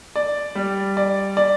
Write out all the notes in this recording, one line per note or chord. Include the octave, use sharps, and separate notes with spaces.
D5
G3
D5
D5